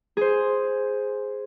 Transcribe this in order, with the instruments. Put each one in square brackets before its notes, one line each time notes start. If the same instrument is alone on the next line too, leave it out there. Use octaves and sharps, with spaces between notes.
[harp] G#4 C5